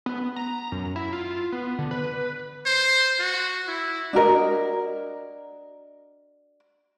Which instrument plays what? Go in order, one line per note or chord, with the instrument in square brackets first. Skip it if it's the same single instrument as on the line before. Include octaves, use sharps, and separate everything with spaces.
[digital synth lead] B3
A#5
F#2
E4
F4
B3
D3
B4
[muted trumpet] C5
F#4
E4
[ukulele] D4 F#4 A#4 D#5